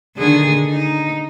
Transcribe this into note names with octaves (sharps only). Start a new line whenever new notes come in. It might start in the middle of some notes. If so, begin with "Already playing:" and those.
D3 D#3 G#4
D#4